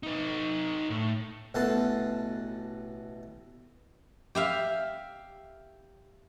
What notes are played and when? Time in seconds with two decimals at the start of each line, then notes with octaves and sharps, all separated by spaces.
0.03 D#4 B4
0.90 A2
1.54 A1 B2 A4 F#5 A5 C6
4.35 G4 E5 F5